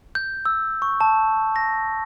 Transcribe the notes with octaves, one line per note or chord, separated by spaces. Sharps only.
G6
E6
C#6
A5
A#6